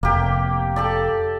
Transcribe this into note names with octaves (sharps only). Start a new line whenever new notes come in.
F1 A#3 G4
G4 A4 D5